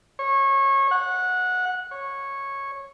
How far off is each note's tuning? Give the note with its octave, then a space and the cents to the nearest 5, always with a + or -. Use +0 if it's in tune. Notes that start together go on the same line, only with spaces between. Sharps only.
C#5 -25
F#5 -15
C#5 -10